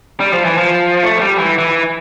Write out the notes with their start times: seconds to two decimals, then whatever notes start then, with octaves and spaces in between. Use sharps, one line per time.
0.20 G3
0.33 F3
0.45 E3
0.58 F3
1.03 A3
1.17 F3
1.20 G3
1.39 E3
1.58 E3